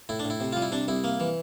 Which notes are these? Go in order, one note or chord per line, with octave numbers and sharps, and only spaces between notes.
A2 E4
D4
A2
E4
C3
G3 F4
E4
C3 D4
C2 E4
A#3
E3